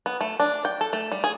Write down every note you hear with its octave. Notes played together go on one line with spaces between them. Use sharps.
B3
A3
D4
G5
A4
A3
G3
G#4